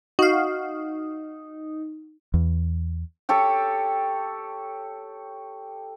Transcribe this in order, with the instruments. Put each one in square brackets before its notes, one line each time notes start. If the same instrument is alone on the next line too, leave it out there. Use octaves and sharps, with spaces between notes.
[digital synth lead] D#4 [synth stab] F#4 F5
[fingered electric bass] E2
[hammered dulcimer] G4 A4 C#5 G5